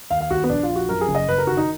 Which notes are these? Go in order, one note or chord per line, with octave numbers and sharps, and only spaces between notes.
D#2 F5
F5
D#2 F#4
B3
A#1 D4
F4
F3
F#4
F#2 A#4
G#4
F#1
D#5
F#1 B4
A#4
D#3 F#4
D#4